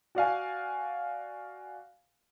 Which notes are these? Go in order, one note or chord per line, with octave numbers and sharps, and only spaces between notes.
F#4 D5 F5 G#5